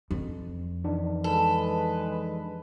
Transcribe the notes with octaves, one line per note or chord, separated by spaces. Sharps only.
F2
E3 D4 D#4
G#3 A4 B4